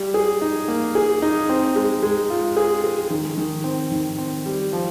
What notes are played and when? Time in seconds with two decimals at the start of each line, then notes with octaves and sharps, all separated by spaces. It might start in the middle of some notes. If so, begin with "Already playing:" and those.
Already playing: G3
0.14 G#4
0.42 D#4
0.68 A#3
0.95 G#4
1.22 D#4
1.49 C4
1.76 G#3
2.03 G#3
2.30 F4
2.57 G#4
2.84 G#4
3.10 D#3
3.38 D#3
3.64 C4
3.92 D#3
4.18 C4
4.46 G3
4.73 F3